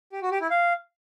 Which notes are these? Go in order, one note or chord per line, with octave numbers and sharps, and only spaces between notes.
G4
F#4
G4
E4
F5